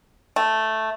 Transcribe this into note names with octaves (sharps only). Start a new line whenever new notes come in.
A3